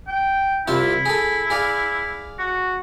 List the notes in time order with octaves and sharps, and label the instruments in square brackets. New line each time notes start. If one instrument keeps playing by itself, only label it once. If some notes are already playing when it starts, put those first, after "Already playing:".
[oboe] G5
[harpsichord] C2 F4 E5 [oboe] E4
[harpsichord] G#4 A4
G#4 D5 F5
[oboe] F#4